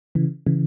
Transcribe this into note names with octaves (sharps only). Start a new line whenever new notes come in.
C#3 E3
C#3 E3